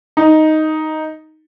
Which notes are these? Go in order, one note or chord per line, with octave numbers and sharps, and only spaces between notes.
D#4